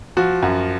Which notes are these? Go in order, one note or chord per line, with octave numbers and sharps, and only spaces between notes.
F3 F#4
F#2